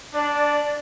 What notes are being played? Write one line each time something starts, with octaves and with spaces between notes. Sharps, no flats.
D4 D5